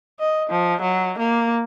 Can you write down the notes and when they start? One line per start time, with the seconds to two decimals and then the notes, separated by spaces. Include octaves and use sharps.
0.20 D#5
0.50 F3
0.81 F#3
1.19 A#3